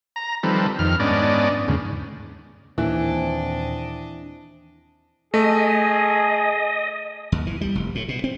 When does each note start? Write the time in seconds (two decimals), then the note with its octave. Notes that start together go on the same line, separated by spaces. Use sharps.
0.16 A#5
0.43 D#3 F3 G3 C4 A4 B4
0.79 F2 D#3 F6
1.00 G#2 B3 C#4 D4 D5 D#5
1.68 D#2 G#2 C#3
2.78 D#2 A#2 E3 C4 D4 D#5
5.34 A3 G#4 D#5
7.32 D#2
7.47 E3
7.61 G3
7.75 F1
7.95 A2
8.09 B2
8.24 C4